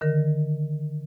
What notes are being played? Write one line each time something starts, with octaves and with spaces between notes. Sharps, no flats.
D3 D#3 A#4